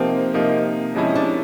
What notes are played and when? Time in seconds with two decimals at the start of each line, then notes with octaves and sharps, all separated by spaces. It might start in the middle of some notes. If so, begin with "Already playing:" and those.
Already playing: C3 F3 A#3 C4 D#4
0.34 C3 F3 A#3 D#4
0.95 C3 F3 G#3 C#4 E4
1.15 D4